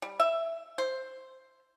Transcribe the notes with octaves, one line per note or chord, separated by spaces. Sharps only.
G3
E5
C5